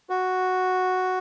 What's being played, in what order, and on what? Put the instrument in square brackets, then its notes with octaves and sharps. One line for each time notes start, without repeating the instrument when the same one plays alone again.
[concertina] F#4